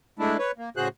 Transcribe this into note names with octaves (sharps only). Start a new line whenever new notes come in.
G#3 A3 D4 E4
B4 C#5
A#3
A2 C#3 F#4 G#4 C5 F#6